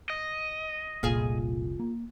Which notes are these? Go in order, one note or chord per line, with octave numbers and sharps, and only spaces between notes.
D#5
F1 C2 A#2 F4 G#4
A#3